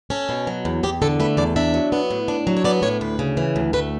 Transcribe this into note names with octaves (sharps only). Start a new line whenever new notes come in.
C#4 A4
B2
F#3
E2
E2 G4
D3 A4
A3 B4
E2 D5
D4 E5
F#3
B3
A2
D4
F#3
C#5
B3 D5
A2 C#5
D2 B4
C#3
E3
D2
A3 B4